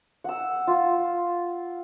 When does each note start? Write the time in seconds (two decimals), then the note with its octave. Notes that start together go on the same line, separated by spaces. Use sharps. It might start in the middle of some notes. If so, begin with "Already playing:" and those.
0.24 F#5 E6
0.67 F4